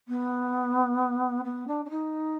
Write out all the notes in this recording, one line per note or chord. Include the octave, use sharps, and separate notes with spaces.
B3
B3
D4
D4
D#4